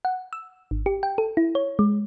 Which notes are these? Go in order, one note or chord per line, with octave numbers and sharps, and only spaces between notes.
F#5
E6
G#1
G4
G5
A4
E4
C#5
G#3